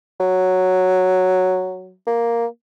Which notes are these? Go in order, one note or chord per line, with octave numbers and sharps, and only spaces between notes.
F#3
A#3